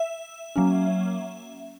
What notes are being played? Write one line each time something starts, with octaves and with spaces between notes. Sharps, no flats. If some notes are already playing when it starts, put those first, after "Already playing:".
Already playing: E5
F#3 A#3 C#4